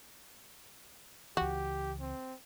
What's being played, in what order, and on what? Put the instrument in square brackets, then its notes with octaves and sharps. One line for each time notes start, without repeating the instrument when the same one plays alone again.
[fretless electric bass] C#2 E3 [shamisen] F#4 [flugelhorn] G4
[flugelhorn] C4